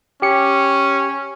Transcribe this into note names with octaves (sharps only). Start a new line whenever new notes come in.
C#4 G4 C#7